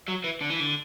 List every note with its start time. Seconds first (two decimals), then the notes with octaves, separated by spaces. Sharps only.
0.08 F#3
0.24 E3
0.41 D3
0.50 E3
0.60 D3